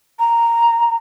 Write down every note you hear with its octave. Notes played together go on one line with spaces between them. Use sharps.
A#5